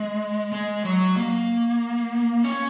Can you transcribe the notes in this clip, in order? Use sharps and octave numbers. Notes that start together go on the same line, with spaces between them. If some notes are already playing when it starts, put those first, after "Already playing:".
Already playing: G#3
G#3
F#3
A#3
C#4